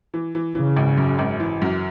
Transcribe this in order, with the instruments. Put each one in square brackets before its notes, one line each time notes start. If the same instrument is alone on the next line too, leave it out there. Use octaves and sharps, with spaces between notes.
[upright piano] E3
E3
[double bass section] C#3 [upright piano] E3
[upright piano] G#1
F#2
G#1
E3
F#2